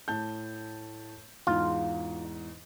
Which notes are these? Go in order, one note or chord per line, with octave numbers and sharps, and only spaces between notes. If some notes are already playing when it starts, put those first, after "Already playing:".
A2 A5 G6
E2 G#2 F4